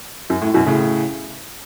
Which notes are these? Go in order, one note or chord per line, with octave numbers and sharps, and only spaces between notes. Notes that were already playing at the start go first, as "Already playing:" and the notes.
F#2
A2
F#2 B2
A2 C#3